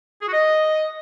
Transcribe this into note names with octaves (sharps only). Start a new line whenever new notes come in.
G#4
F#4
D#5